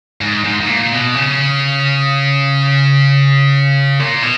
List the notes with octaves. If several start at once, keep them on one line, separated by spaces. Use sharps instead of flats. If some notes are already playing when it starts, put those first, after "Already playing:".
G#2
G#2
G#2
A#2
B2
C#3
A#2
B2